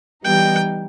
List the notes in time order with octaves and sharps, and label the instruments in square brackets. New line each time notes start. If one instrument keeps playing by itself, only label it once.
[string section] E3 G3 B3 D#4 [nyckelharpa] G5